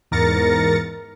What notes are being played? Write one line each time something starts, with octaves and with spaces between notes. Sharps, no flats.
E2 G#2 A#4 A6 A#6 C#7